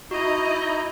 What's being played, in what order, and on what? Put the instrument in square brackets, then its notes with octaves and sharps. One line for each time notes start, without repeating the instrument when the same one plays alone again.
[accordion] D#4 E4 A#5 [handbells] F#4 [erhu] D#5